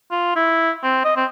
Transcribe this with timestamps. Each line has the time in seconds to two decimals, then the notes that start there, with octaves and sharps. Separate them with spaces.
0.11 F4
0.36 E4
0.83 C4
1.05 D#5
1.16 C4